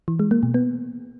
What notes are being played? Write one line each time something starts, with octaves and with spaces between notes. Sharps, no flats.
E3
G#3
A#3
B2
B3